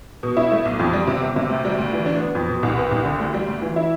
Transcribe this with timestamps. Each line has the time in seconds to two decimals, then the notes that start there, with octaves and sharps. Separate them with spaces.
0.23 B2
0.37 E4
0.52 A3
0.65 B1
0.79 F2
0.93 G3
1.07 C3
1.22 G1
1.36 C3
1.49 D2
1.65 G3
1.78 D2
1.93 E3
2.06 D4
2.20 B3
2.35 F2
2.48 B2
2.63 C2
2.77 B3
2.91 C2
3.05 D3
3.20 D2
3.34 G3
3.48 D2
3.62 E3
3.76 E4